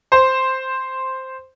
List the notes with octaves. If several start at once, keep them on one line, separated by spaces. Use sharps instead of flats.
C5